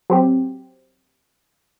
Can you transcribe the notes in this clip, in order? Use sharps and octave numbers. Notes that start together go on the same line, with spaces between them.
F#3 C4 G4